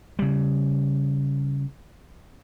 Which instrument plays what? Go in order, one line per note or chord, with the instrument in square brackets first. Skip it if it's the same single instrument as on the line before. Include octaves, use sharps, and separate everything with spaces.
[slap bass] C#3 G3